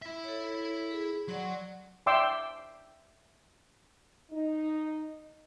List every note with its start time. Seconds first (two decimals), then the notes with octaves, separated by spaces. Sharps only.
0.02 E4 E5
0.24 A4 C#5
0.91 G#4
1.28 F#3 D5 F#5 C6
2.06 D5 E5 G5 C6 D6 E6
4.31 D#4